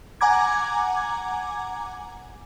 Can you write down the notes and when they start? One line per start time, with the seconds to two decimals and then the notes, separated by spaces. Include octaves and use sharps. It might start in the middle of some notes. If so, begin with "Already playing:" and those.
0.21 F#5 G#5 A#5 D6 G#6